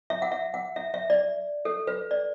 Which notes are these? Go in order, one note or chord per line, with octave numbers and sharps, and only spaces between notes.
E5
F#5
E5
F#5
E5
E5
D5
A4
B4
D5